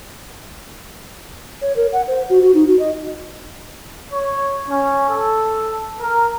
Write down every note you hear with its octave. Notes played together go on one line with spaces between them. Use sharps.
C#5
A#4
F#5
C5
F#4
F#4
D#4
F#4
D#5
C#5
C#4
A4
A#4